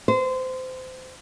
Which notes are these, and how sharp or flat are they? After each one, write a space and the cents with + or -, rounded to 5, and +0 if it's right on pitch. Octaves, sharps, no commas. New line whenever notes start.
C5 -25